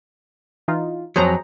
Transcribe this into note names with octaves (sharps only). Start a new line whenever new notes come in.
E3 D#4 F4
F2 F#3 G#4 C5 A#5